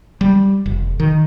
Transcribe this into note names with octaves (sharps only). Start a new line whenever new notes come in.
G3
F1
D#3